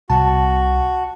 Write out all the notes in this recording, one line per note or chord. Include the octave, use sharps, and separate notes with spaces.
C2 C3 G3 F#4 A5